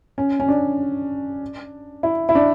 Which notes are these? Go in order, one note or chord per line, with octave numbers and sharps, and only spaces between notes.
C#4
C#4
D4
E4
E4
D4